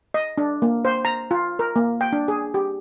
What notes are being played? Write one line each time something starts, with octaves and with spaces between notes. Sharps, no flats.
D#5
D4
A#3
C5
A#5
F4
A#4
A#3
G5
D4
G#4
G4